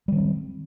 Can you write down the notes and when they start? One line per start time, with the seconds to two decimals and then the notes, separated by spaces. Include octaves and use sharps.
0.08 G3
0.12 D#3
0.16 C4